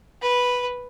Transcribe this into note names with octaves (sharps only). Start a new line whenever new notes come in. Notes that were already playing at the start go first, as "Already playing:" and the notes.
B4